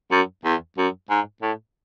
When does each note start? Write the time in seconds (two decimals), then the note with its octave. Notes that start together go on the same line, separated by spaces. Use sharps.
0.12 F#2
0.45 E2
0.78 F#2
1.10 G#2
1.42 A2